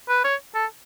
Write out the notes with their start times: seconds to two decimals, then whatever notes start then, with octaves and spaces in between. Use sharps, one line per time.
0.09 B4
0.24 C#5
0.55 A4